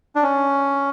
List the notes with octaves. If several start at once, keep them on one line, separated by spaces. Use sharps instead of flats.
D4
C#4